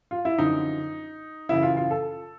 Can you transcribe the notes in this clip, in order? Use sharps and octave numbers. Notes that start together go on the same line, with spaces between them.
F4
E4
F#2 D3 F3 D#4
F#2 C#3 E3 E4
F4
F4
A4